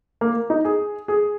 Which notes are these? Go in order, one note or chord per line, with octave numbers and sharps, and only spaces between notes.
A#3
D#4
G#4
G#4